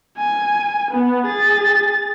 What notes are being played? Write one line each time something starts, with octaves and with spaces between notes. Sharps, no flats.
G#5
B3
G#4 A6